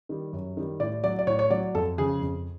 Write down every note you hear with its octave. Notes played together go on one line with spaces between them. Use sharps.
D#3 G3
F#2
D#3 G3
A2 D5
F#3 D5
D5
A2 C#5
C#5
F#3 D5
F2 A4
C#3 F3 G#4
F2